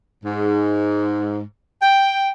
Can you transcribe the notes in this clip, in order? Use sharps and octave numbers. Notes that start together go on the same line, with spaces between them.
G#2
G5